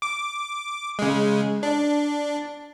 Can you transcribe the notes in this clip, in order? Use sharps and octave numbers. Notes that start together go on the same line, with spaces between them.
D6
C#3 G#3
D4